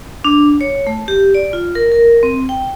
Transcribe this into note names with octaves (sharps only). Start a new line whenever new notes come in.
D4
C#5
A3
G4
D5
F4
A#4
A#4
C4
G5